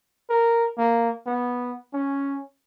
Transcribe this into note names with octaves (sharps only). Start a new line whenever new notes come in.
A#4
A#3
B3
C#4